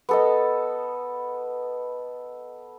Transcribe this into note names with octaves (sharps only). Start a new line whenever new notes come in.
B3 A4 D#5